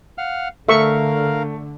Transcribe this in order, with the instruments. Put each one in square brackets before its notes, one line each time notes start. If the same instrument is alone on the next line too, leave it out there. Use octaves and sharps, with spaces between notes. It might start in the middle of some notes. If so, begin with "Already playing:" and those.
[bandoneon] F5 F#5 F6
[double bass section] D3 [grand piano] A3 [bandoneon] A#4 F5 [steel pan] E5 C#6